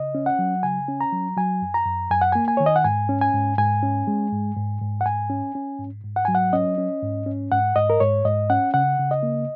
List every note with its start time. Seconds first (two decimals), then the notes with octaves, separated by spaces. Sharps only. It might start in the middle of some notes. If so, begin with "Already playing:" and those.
Already playing: C#3 D#5
0.15 C#4
0.26 F#5
0.39 F#3
0.63 C#3 G#5
0.88 C#4
1.01 A#5
1.13 F#3
1.37 F#3 G#5
1.62 F#2
1.74 A#5
1.86 F#2
2.11 F#2 G#5
2.21 F#5
2.32 A#3 G#5
2.48 G#5
2.57 D#3 C#5
2.66 D#5
2.76 F#5
2.84 G#2 G#5
3.09 C#4
3.21 G#5
3.34 G#2
3.58 G#2 G#5
3.83 C#4
4.07 G#3
4.32 G#2
4.57 G#2
4.81 G#2
5.01 F#5
5.06 G#2 G#5
5.30 C#4
5.55 C#4
5.79 G#2
6.04 G#2
6.16 F#5
6.25 F#3 G#5
6.35 F#5
6.53 C#4 D#5
6.78 C#4
7.02 G#2
7.26 C#4
7.51 G#2 F#5
7.76 G#2 D#5
7.90 A#4
8.00 G#2 C#5
8.25 G#2 D#5
8.50 C#4 F#5
8.74 C#3 F#5
8.99 C#3
9.11 D#5
9.23 A#3